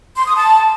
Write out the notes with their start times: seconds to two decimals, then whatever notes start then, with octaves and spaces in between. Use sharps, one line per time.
0.16 C6
0.26 D#6
0.36 A5